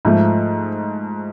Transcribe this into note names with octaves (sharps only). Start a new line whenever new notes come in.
G#2 F3 A3